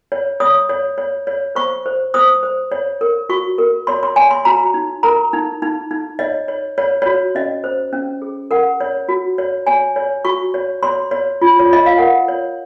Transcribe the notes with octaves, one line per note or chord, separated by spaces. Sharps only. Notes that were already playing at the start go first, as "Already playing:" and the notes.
C#5
C#5 D#6
C#5
C#5
C#5
C5 C#6
C5
C5 D#6
C5
C#5
A#4
F#4 C#6
A#4
C#5 C6
C6
C#5 G#5
C6
F#4 A#5
D#4
A#4 A#5
D#4
D#4
D#4
C#5 D#5
C#5
C#5
F#4 C#5
C#4 D#5
C5
C#4
G#4
A#4 F#5
C#5
F#4
C#5
C#5 G#5
C#5
F#4 C#6
C#5
C#5 C6
C#5
F4
C#5
F4 D#5
F5
A#4 F#5
C#5